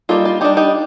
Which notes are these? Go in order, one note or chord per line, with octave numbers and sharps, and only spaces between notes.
G3 A#3 D#4 F4 A4
F4
G3 D4 D#4 G4
D#4 G4